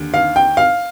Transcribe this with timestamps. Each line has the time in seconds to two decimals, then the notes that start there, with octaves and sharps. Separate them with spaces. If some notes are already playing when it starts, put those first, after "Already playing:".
Already playing: D#2 D3
0.14 F5
0.36 G5
0.57 F5